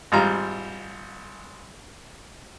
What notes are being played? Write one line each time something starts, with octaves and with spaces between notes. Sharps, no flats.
G#1 G3 F4 A#5